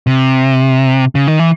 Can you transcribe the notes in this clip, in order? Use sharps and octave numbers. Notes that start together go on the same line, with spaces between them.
C3
C#3
D#3
E3